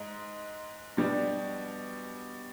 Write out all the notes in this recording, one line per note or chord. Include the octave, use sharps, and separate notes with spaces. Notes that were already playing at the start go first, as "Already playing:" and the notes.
Already playing: G#2 G#3
B2 G3 D4